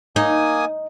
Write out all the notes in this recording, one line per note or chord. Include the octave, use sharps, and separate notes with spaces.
A#3 D#4 G#5 D#6